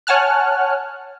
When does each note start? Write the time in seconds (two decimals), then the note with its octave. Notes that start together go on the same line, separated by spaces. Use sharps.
0.07 C#5 F#5 G#5 A5 F6 F#6